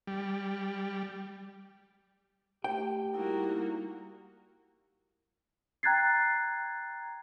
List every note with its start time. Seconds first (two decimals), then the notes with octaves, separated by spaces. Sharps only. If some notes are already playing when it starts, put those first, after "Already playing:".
0.07 G3
2.64 A3 G4 G5
3.14 G3 A#3 D#4 E4 F#4
5.83 G5 A#5 F#6 G#6 A6 C7